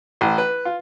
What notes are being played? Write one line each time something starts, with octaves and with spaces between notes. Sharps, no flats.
A1
B4
F4